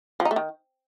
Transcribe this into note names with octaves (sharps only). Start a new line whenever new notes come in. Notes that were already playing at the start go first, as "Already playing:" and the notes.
F3
D#4
A3
D#3